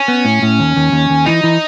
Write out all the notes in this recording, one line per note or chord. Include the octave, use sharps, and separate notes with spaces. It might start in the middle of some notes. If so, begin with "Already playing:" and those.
Already playing: C#4
B3
A2
A2
D#2
D#2
D#2
D#2
E3 D#4
E3